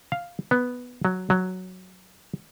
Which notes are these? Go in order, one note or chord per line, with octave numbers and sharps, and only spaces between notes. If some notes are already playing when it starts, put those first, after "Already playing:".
F5
B3
F#3
F#3